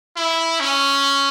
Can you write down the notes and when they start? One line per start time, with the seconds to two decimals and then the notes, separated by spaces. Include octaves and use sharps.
0.17 E4
0.60 C#4